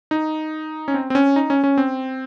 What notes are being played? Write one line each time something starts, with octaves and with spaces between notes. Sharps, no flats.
D#4
C#4
C4
C4
C#4
D#4
C#4
C#4
C4